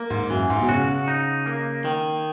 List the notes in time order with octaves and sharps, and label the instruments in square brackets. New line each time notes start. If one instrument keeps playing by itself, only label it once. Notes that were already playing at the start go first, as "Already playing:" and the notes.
Already playing: [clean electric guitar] A#3
[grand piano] G#2
[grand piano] F#2 [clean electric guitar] E3
[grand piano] G#2
B2
[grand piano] C#3 [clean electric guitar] F#4
[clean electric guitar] D#4
A#3
D#3